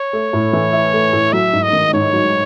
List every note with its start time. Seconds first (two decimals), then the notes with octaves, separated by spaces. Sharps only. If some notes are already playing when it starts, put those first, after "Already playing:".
Already playing: C#5
0.13 A3
0.33 A2
0.53 E3
0.73 E4
0.94 A3
1.13 A2
1.33 F#3 E5
1.53 G#2
1.63 D#5
1.73 D#3
1.93 G#2 C#5
2.12 F#3